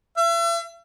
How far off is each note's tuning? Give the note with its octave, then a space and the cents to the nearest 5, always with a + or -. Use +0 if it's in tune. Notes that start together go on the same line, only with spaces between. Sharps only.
E5 +40